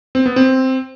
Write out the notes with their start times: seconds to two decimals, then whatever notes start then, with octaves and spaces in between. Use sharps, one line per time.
0.15 C4
0.26 B3
0.36 C4